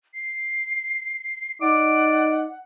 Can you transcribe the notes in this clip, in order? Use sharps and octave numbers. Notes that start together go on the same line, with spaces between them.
C7
D#4 D5 F#5 D6